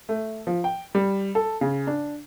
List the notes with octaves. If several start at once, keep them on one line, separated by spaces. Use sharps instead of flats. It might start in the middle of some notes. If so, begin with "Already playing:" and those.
A3
F3
G5
G3
A4
C#3
D4